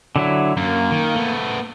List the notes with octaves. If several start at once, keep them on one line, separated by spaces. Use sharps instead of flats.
D3 F#3 E4
F#2 A#3
D#3
A3 B3